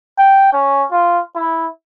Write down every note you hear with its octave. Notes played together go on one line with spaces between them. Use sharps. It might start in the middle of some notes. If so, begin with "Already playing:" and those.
G5
C#4
F4
E4